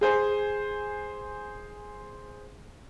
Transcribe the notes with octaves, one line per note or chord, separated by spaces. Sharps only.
G#4 C5 G#5